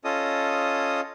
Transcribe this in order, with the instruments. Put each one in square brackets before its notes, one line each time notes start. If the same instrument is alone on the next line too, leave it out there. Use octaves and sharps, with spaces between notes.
[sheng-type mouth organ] C#4 F4 A4 D#5 D#6